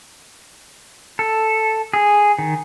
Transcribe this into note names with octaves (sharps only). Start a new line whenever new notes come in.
A4
G#4
D#3